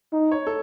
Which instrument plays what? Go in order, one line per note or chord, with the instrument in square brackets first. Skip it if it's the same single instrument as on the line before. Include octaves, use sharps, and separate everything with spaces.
[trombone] D#4
[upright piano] C#5
A4